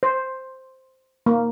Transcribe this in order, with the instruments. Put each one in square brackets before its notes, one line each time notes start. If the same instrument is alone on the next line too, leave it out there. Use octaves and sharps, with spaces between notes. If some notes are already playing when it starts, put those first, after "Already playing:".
[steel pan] C5
A#3